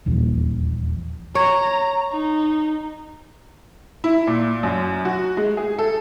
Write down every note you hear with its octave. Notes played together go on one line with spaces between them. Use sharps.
D#1 A#1 E2
C#5 A#5
D#4
E4
A#2
F#2
F#4
G#3
G#4
A4